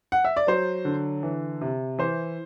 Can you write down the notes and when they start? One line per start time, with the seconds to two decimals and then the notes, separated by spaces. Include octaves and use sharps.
0.12 F#5
0.24 E5
0.37 D5
0.47 F#3 C5
0.85 D3
1.23 E3
1.61 C3
1.98 E3 C5